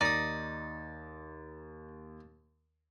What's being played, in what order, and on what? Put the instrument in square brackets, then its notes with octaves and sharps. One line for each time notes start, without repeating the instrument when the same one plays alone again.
[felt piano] D#2 [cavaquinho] D#4 [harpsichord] D5 D#6 [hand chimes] A6